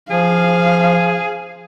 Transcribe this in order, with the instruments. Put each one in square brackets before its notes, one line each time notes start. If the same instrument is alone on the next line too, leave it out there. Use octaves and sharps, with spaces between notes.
[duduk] F3 [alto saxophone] G#4 [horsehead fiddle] F5